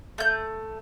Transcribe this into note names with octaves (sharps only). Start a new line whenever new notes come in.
A3 G6